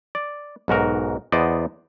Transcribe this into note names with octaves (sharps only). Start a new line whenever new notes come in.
D5
B1 G#2 F#4 A#4
E2 B3 C5 D5 D#5